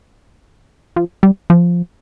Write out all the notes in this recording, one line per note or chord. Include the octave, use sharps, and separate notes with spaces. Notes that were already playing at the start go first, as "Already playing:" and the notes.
F3
G3
F3